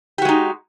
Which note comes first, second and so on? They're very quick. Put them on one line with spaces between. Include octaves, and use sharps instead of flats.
G4 F#4 G#3 D#4